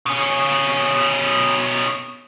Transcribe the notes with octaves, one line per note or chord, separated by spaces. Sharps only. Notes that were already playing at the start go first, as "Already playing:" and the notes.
B2 C#4